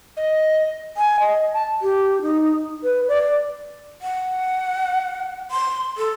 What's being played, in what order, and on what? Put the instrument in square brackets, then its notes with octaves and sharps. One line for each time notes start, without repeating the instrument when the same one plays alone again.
[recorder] D#5
[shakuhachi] G#5
D#5
A5
G4
D#4
B4
D5
F#5
C6
A4